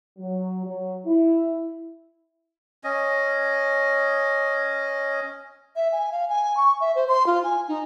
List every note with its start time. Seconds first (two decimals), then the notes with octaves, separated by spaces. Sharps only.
0.18 F#3
0.66 F#3
1.06 E4
2.84 C#4 D#5
5.76 E5
5.92 G#5
6.12 F5
6.29 G#5
6.57 C#6
6.81 E5
6.95 C5
7.08 C6
7.27 F4
7.44 G#5
7.68 D#4